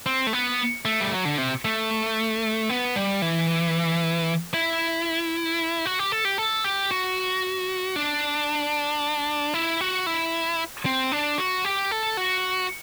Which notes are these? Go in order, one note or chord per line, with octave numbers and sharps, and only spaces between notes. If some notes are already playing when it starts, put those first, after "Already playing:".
C4
A3
B3
A3
G3
F#3
D3
C3
A3
B3
G3
E3
E4
F#4
G4
A4
G4
A4
G4
F#4
D4
E4
F#4
E4
C4
D4
F#4
G4
A4
F#4